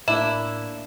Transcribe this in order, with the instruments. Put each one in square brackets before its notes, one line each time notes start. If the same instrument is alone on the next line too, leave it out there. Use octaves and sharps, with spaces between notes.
[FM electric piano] A2 [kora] A#3 D4 [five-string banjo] E4 [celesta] E7